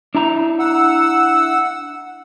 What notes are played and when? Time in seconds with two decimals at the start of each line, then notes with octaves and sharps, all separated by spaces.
0.15 D4 E4 A#5
0.59 F#5 E6